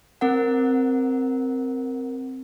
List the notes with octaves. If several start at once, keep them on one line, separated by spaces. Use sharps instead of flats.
C4 A#4 F#5